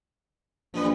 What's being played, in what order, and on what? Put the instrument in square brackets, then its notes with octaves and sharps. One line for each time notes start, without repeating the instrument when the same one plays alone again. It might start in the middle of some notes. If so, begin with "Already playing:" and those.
[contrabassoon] A#1 [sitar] F3 G3 B4